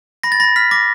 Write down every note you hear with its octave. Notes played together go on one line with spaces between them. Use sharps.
B5 A#6
A6
B5 A#6
F6 B6
D6 A#6